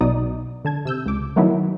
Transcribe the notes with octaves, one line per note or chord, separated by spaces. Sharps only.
B1 B2 B3 D#4 D5 D#6
D3 A5 G#6
C3 E6 G6
C#2 D6
D#3 F#3 A3 B3 D#4 E4